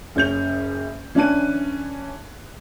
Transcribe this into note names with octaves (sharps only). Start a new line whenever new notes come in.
F#1 C#4 G6 F7
E3 C#4 D4 A5 F#6 D#7